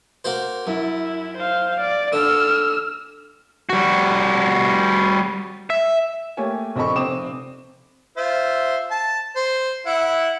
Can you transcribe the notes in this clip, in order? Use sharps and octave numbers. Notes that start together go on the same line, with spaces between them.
A#3 F#4 C5
F#2 E4
C5 F5
D5
D3 E6 F6
G3 F#4
E5
A3 A#3 G4 C#5 G#5
A#1 C4 A4 D#5 B5 C#6
F1 C4 D6 D#6 E7
F4 C5 E5
A5
C5
E4 F#5